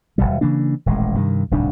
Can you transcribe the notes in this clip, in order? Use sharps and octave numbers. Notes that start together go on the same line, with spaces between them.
D#1 C2 B2 G3
C#3 E3 A#3 D4
D#1 A1 G#3
G2 C3 D#3
D1 C2 G#2 D4